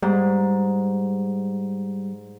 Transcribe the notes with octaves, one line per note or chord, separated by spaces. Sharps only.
G#2 G3